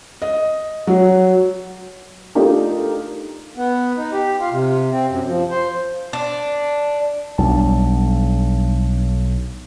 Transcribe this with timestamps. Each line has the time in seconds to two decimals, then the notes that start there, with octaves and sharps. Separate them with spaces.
0.22 D#5
0.87 F#3
2.35 A3 D4 D#4 F4 G4 A#4
3.57 B3
3.96 D#4
4.12 G4
4.40 F4
4.51 C3
4.91 C4
5.09 F#2
5.27 F3
5.50 C5
6.13 D4
7.38 B1 G3 D4 A5